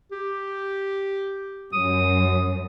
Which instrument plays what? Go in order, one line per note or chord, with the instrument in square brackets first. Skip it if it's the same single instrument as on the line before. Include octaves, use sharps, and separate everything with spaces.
[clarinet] G4
[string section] F#2 [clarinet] D#6